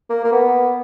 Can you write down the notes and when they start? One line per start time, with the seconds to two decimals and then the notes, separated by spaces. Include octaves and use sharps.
0.10 A#3
0.24 A#3
0.32 B3